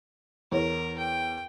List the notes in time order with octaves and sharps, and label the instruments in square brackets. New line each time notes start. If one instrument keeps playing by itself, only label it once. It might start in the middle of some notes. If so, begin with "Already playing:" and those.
[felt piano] E2 C#5 [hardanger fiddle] A#4
[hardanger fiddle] G5